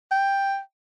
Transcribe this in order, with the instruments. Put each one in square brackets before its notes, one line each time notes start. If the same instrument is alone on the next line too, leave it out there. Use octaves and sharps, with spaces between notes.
[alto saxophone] G5